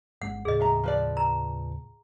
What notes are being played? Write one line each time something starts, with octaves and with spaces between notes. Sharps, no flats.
G1 G#3 C#4 F#5
D#2 A2 C#3 G#4 D#5
G#3 E5 A#5
F3 B4 D5
A#5